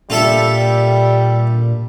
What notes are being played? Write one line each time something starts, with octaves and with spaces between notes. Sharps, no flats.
A#2 G3 F4 A4 E5